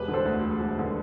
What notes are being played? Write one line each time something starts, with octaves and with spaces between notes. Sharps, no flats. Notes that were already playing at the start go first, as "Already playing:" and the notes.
Already playing: E1 G4 B4
D3
A4 C5
D2
E1
E1
D3